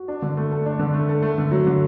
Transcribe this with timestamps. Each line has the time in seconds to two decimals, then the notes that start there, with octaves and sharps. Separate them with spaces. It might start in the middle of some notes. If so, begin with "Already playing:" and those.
Already playing: F#4
0.08 D4
0.22 D3
0.37 A3
0.51 A4
0.66 D4
0.79 D3
0.94 A3
1.09 A4
1.23 A3
1.38 D3
1.51 F#3
1.66 D3